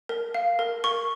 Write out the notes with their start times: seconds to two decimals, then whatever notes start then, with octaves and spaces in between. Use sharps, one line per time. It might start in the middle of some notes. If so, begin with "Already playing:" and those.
0.09 A#4
0.34 F5
0.59 A#4
0.84 A#4 C#6